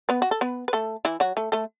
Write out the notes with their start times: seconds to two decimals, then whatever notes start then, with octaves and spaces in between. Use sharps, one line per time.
0.09 B3 B4
0.22 F#4
0.31 A4
0.41 B3 B4
0.68 B4
0.73 A3 A4
1.05 E3 E4
1.20 F#3 F#4
1.37 A3 A4
1.52 A3 A4